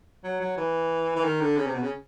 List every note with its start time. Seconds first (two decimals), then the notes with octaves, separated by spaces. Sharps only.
0.24 F#3
0.40 F#3
0.57 E3
1.16 E3
1.24 D#3
1.41 D3
1.57 C#3
1.66 C3
1.74 B2
1.82 C#3